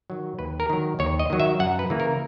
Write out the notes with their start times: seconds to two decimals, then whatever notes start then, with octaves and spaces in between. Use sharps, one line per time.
0.10 D#3 F#3
0.39 D#2 B4
0.60 A#4
0.69 D#3 F#3
0.99 D#2 C#5
1.19 D#5
1.30 D#3 F#3
1.40 E5
1.59 F#2 F#5
1.79 B4
1.90 C#3 E3 A#3
2.00 A#4